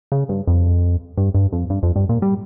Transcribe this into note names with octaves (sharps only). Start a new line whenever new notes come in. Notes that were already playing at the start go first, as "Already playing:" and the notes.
C#3
G2
F2
G2
G2
F2
G2
F2
G2
A#2
G3